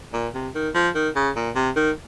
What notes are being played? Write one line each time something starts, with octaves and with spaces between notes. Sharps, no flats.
A#2
C3
D#3
F3
D#3
C#3
A#2
C3
D#3